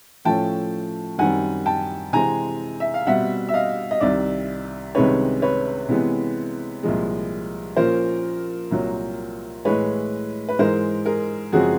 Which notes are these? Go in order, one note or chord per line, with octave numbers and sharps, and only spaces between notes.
A2 F3 A3 C#4 G5 A5
F#2 D#3 G3 C4 F#5 G#5
G5 A5
C3 E3 G#3 C4 G#5 A#5
E5
F5
B2 G3 C4 E5 F#5
E5
D#5 F5
D#5
C2 C3 D#3 D5 E5
C2 C3 D#3 G#3 C#4 B4 C#5
B4 C#5
C3 E3 G#3 B3
C2 A#2 F3 G#3
A#2 F3 A#3 C#4 A#4 C5
C2 A#2 F#3
A2 E3 G#3 B4 C#5
B4
G#2 E3 G#3 A#4 C5
G#4 A#4
F#2 C#3 F3 G#3 C4 F#4 G#4